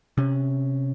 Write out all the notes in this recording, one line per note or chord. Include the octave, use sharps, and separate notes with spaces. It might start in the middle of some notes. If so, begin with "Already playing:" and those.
C3 C#4